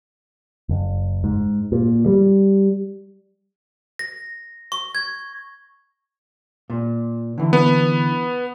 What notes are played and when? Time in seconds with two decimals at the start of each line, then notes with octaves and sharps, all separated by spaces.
0.69 F#1
1.24 G#2
1.72 A#2
2.06 G3
3.99 A#6
4.72 C#6
4.95 G#6
6.70 A#2
7.38 D3 E3
7.53 B3